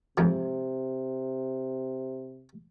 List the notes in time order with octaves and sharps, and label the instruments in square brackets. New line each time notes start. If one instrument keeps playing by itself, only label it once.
[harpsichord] F2 G#2 F3 [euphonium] C3